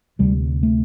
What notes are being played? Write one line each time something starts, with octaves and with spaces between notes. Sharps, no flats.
D2 C3 G3
A3